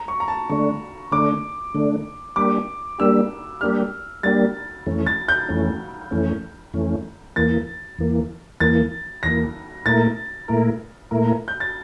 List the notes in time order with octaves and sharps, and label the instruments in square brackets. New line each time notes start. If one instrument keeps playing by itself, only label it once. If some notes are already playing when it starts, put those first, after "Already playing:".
Already playing: [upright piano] A#5
C#6
A#5
A5
[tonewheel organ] D3 A3 D4 [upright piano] C#6
[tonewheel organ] D3 A3 D4 [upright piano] D6
[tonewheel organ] D3 A3 D4
[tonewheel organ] G3 A#3 D4 G4 [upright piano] D6
[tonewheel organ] G3 A#3 D4 G4 [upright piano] E6
[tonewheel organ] G3 A#3 D4 G4 [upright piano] F6
[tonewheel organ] G3 A#3 D4 G4 [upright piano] A6
[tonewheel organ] F2 E3 A3 C#4
[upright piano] A6
G6
[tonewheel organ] F2 E3 A3 C#4
F2 E3 A3 C#4
F2 E3 A3 C#4
[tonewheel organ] E2 E3 A#3 [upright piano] A6
[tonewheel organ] E2 E3 A#3
[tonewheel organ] E2 E3 A#3 [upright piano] A6
[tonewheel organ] E2 E3 A#3 [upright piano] A#6
[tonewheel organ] A#2 A3 E4 A#4 [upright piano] A6
[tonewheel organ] A#2 A3 E4 A#4
A#2 A3 E4 A#4
[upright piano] G6
A6